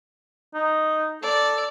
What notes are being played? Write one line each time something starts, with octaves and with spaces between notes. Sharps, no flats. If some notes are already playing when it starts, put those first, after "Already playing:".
D#4
A4 D5